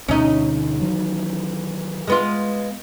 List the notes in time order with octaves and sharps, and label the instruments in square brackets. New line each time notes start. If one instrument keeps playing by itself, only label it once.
[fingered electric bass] D2 B2 D3 [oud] C#4 D#4
[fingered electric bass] D#3 E3 F#3
[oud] G#3 B3 F4